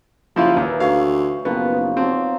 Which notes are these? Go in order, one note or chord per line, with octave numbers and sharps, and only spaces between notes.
F#1 F3 F#3 E4 F4
D#2 E3 D#4 E5
D2 C#5 F5
F#1 B2 D#3 F3 B3
F3 F#3 C4